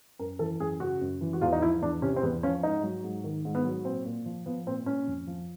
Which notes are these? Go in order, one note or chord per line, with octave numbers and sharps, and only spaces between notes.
F#2 A#4
E3 A4
F#2 G#4
C#3 F#4
F#2
E3
F#4
E2 F4
D#4
F3 E4
E2 D4
C3 C#4
C4
E2 B3
F3 C#4
G#2 D#4
F#3
G#2
D#3
G#2
B3
F#3
A#2 C4
A#2
F3
F3 B3
A#2 C4
A#2 C#4
F2
F3